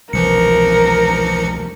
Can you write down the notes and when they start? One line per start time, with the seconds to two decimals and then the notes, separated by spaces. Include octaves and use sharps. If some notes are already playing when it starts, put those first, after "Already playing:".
0.13 E1 C2 E3 F3 A#4 C#7